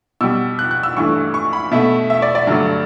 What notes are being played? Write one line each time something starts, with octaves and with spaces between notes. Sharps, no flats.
B2 G3 E6
F#6
F#6
E6
G2 E3 A3 C#6
C#6
B5
B2 A3 E5
E5
D5
D5
G2 D3 F#3 A3